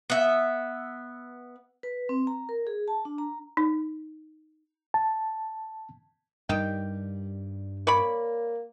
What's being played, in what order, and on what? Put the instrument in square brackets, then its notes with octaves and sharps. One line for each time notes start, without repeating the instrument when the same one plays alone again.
[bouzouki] B3 E5
[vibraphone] B4
C4
A#5
A#4
G#4
A5
D4
A#5
[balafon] D#4
[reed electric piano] A5
[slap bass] G2 G3 [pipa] D#3 G5
[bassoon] A#3 [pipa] C#5 D5 B5